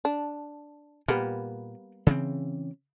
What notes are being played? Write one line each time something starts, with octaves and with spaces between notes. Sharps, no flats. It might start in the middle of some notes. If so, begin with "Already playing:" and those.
D4
A#2 G3 A#3 B3
C#3 E3 C4